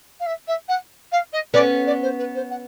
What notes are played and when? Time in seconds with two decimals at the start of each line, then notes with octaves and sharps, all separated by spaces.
0.20 F5
0.26 E5
0.47 E5
0.68 F#5
1.12 F5
1.33 D#5
1.53 B3 C#4 D5
1.86 D5
2.02 C5
2.18 B4
2.35 C5
2.50 F#5